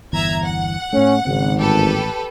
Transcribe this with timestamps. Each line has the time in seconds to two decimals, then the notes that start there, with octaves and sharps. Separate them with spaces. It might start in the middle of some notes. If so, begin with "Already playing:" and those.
0.13 G1 E2 E3 E5 A#5 G#6
0.44 F#5
0.93 A2 A3 C#4
1.25 G#1 C#3 C4
1.59 A1 G4 A4 B4